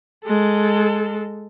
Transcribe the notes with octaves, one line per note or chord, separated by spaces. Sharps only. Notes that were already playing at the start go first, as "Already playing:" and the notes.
G#3 A4